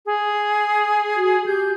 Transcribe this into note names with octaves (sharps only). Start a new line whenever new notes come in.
G#4
F#4
G4 G6